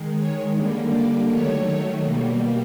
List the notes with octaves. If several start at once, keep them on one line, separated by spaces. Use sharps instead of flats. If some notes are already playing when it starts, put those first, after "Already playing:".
Already playing: D#3 G#3
C#5
D3 G3 A#3
D5
D#3 F#3 A3 C#5
B2 G3 A#3